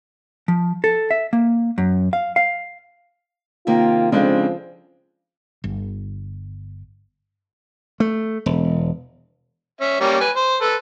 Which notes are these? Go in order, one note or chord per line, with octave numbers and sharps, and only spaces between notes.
F3
A4
E5
A#3
F#2
F5
F5
C3 D#3 A#3 F4
C#3 F3 G#3 C4 D4 A4 F5
G1
A3
E1
C#4 E5
G3 A#3 C#4
B4 G#5
C5
A4 B4